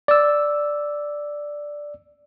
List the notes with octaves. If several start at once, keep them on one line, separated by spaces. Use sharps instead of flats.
D5 E6